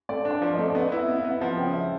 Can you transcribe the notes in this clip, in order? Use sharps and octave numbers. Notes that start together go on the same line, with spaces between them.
A3 D5
D4
D5
F3
D#5
A3
D5
B3 D#5
E4
E5
B3
F5
B3
F3 F#5
C#3 G5
E5